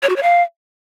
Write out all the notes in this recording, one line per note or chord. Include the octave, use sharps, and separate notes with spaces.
C#5
F#4
C#5
F5